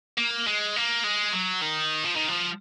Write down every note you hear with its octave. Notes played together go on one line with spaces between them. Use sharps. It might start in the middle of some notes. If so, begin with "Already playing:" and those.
A#3
G#3
A#3
G#3
F#3
D#3
F3
D#3
F3